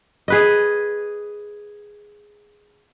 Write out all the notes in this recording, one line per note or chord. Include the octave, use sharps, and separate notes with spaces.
G#4 B4 D#5